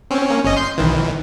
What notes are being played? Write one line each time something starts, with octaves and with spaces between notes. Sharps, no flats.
C4 C#4
A#3 C#4
G1 C#4 D#5
C6 G6
B1 D#3 E3